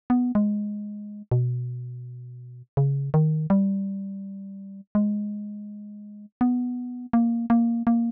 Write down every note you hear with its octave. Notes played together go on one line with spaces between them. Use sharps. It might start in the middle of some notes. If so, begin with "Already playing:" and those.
B3
G#3
B2
C#3
D#3
G3
G#3
B3
A#3
A#3
A#3